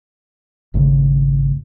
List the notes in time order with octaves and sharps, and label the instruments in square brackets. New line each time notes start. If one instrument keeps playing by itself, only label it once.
[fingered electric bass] G#1 F2 C#3 A3